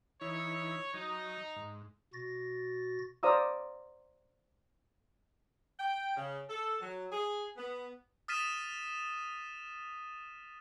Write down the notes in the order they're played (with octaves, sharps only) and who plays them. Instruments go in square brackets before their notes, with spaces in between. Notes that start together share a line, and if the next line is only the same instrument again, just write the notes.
[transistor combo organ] E3 D#4 E4 [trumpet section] C#5
[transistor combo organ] F#3 D#6 [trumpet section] D#4
[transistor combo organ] G#2
[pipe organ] B2 F#4 A6 A#6
[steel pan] C5 D5 F5 A#5 D#6 E6
[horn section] G5
C#3
A4
F#3
G#4
B3
[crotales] D#6 F6 A6 B6 D#7 E7